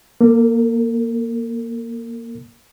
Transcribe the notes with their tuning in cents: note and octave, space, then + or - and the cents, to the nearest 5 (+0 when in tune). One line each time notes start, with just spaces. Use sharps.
A#3 +10 A#4 -45